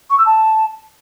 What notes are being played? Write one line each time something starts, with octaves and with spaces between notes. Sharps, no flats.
C#6
E6
A5